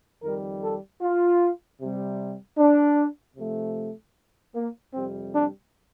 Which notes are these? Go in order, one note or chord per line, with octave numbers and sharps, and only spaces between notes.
F2 D#3 G3 A#4
A4
F4
C3 G3
D4
C3 F3 A3
A#3
F2 C3 G3 C4
D4